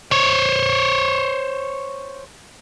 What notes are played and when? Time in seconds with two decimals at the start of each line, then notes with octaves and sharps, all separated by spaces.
0.11 C5 C#5